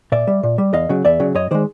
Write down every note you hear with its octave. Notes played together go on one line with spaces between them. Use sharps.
A#2 D5 E5
G3
A#2
G3
E2 D#5 F5
C#3 F#3
E2 D5 E5
C#3 F#3
F#2 C#5 D#5
D#3 G#3 C5 D5